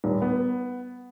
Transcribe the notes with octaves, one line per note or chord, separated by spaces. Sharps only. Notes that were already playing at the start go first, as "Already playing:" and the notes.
D#1
B3